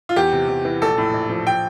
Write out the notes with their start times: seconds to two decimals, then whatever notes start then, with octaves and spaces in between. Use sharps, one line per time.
0.09 F4
0.16 E2 G4
0.33 C3
0.48 E2
0.65 E3
0.82 A#1 A4
0.98 A2
1.14 A#1
1.30 F3
1.47 G5